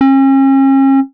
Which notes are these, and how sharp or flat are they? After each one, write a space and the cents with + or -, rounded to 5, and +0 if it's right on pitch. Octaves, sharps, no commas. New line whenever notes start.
C#4 -40